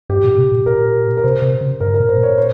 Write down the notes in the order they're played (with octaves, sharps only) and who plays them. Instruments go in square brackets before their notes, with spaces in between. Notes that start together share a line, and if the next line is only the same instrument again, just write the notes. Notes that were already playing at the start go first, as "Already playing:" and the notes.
[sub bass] G2 [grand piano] G4
[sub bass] A#2
C3
A#2
[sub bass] A#2 [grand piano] A#4
[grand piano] A#4
[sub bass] C3 [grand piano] C5
[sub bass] C3
C#3
[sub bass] G2 [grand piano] A#4
[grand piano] A#4
[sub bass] A#2
[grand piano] C5
[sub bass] A#2
[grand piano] C#5
C5